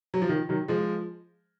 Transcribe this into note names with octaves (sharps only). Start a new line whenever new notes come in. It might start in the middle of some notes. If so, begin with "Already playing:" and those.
F#3
F3
D#3
D#3 F#3
F3 G#3